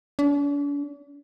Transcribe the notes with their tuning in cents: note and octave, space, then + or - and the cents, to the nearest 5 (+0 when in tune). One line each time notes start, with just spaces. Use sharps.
D4 -45